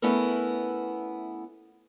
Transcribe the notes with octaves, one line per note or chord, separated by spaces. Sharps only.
A3 B3 C#4 E4 A4 A#4